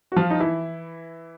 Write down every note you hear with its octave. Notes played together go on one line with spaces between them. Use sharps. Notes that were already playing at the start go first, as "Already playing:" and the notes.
F#4
F3 F4
D#4
E3 E4